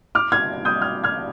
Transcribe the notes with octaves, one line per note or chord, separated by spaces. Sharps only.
D6 F6
F6 G#6
D#6 G6
F6 G#6
F6 G#6